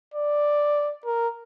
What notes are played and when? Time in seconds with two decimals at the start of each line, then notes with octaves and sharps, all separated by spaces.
0.14 D5
1.05 A#4